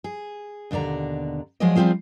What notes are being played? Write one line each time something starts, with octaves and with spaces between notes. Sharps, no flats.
G#4
D#2 B2 D3 D5 A#5
F3 F#3 G#3 G#4 D5 D#5
F3 G3 A#3 C4 F4 G#4